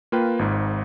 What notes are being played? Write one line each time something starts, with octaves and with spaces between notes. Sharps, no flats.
A#3 F4 B4 G5
G#1 G#2